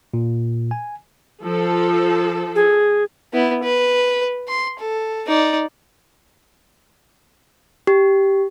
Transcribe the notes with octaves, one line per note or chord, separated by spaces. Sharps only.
A#2
G#5
F3 A4
G#4
B3 E4
B4
C6
A4
D#4 D5
G4